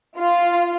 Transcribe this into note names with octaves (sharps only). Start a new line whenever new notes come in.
F4